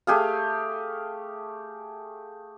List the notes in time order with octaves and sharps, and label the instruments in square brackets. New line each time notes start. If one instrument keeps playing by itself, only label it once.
[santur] A3 G4 G#4 F5